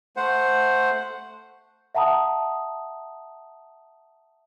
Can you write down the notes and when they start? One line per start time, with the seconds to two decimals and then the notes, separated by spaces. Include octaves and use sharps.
0.17 A3 C5 F#5
1.95 E5 F#5 A5 A#5 D#6